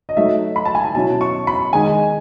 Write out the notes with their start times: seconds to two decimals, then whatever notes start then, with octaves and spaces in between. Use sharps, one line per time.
0.09 D#5
0.17 F#3 A3 D#4 E5
0.56 B5
0.65 A5
0.75 G#5
0.84 A5
0.95 B2 F#3 C#4 E4 A5
1.21 C#6
1.47 B5
1.72 D#3 G#3 D#4 G#5